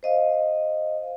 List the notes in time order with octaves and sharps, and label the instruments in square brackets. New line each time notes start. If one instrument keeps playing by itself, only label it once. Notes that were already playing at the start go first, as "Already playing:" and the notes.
[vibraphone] C5 D#5 F5